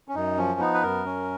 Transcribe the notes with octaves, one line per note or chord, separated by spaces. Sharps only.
C#4
F#2 D#4
F3 C#4
B3 D#4
B4
F#2 A#4
C#4